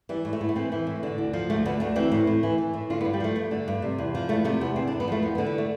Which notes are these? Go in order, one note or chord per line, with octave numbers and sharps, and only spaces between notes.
E3 G3
A2
A3
A2 B3
A3
E3 C4
E3
A2
D3
D2
F3
D2 A3
D3 B3
D2 A3
E3 C4
A2
A2
E3
E3
A2
D3 F4
B3
G2
G3
F3 A3
G2
D3
G2
C3
E2
F3
E2 A3
C3 A3
E2 B3
D3 C4
D4
E2
B3
F3 A3
E2 B3
B3
D3
B3
A3